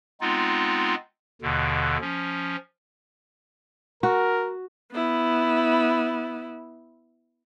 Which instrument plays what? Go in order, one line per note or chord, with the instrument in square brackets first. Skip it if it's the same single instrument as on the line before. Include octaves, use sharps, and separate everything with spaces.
[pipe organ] G#3 B3 C4 D#4 F4
D#2 B2 D3
F3 C#4
[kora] F#4 [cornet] A#4
[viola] B3 E4